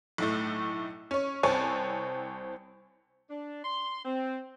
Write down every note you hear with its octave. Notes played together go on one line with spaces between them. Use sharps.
B1 A2 A3
C#4 C#5
C2 C4 C#5 G#5 A5
D4
C6
C4